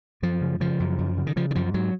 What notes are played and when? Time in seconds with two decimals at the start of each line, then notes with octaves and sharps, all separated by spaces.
0.22 F#2 F3
0.42 C#3
0.60 C#3 F3
0.80 F#2
0.99 F#2
1.17 C#3
1.27 D#3
1.36 C#3 F3
1.51 D#3
1.55 F#2 F3
1.74 G#2 F#3